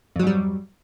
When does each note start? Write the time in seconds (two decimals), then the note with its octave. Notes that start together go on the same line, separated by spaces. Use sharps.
0.16 F2
0.19 F#3
0.23 G#2
0.27 G3